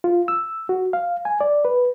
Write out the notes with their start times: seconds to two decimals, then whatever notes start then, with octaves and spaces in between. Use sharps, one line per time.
0.04 F4
0.28 E6
0.69 F#4
0.93 F5
1.25 G#5
1.41 D5
1.65 B4